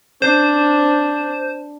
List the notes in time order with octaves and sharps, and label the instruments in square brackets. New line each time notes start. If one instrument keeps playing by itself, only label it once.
[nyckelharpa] D4 [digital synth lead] C5